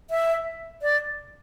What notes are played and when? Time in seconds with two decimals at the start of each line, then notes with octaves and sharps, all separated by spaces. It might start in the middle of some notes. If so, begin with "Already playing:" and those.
0.10 E5
0.82 D5